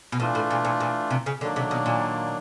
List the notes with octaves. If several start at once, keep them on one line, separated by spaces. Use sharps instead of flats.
B2
A#2 E3 A3 D4 F4
A2
A#2
A#2
A#2
C3
C#3
D3 D#3 F#3 A#3 D4
C3
B2
A#2